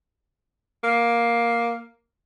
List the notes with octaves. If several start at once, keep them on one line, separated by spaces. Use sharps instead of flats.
A#3